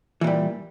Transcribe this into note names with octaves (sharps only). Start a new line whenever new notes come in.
A#2 E3 G3